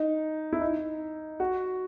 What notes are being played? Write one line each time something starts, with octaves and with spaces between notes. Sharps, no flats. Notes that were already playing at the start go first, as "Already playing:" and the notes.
Already playing: D#4
E4
D#4
F#4